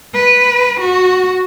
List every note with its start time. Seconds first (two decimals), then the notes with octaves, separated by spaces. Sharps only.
0.14 B4
0.80 F#4